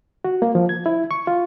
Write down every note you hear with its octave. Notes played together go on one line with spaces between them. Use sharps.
F#4
A#3
F3
G#6
E4
C#6
F4